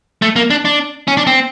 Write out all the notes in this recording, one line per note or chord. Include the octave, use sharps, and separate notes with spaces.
A3
A#3
D4
D4
C#4
D4
C4